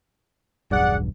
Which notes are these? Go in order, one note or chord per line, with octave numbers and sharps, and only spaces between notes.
E1 B1 G2 G#4 D5 F#5